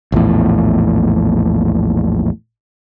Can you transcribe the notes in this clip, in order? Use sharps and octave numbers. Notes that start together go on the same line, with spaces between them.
A#1 E2 A2